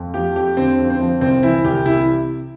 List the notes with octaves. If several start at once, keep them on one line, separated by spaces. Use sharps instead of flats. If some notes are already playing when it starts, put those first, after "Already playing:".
Already playing: F2
F3 G4
F2 G4
D3 C4
F2
C4
F3
C2 C4
E3 E4
C2 G4
C3 E4